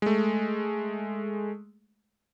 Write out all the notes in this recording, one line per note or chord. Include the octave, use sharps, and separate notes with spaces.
G#3 A3